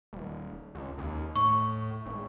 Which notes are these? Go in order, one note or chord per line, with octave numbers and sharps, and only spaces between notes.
D#1
C#2
D#2
A2 C#6
G#1